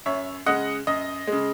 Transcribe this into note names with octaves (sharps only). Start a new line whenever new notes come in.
F#2 C#5 E5
C#3 G#3 D#5 F#5
F#2 D#5
C#3 G#3